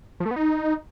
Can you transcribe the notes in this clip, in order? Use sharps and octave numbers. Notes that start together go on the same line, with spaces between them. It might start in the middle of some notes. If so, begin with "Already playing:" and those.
F3
A3
B3
D#4